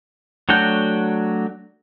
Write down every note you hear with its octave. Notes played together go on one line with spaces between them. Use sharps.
F#3 A3 D4 F#4 G5